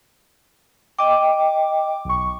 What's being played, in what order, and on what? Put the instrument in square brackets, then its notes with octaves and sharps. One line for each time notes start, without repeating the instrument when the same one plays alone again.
[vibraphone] D#5 G5 [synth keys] D6
[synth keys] B1 C#6